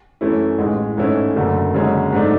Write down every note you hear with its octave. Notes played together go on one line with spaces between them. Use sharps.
F#2 E3 A3 C#4 E4
A1 A2 G#3
G#2 E3 A3 C#4 E4
F#1 F#2 D3 A3
F#1 F#2 D3 G#3 C#4
G#2 F#3 A3 D4